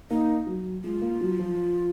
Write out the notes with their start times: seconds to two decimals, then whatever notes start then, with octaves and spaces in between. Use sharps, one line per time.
0.10 A#3 D#4
0.47 F#3
0.84 G#3 F4
1.02 A#3
1.21 F#3
1.39 F3